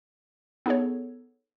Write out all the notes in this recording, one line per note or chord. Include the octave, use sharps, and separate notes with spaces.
B3 D#4 G#4 A4 C#5